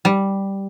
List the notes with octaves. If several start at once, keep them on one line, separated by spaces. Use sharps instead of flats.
G3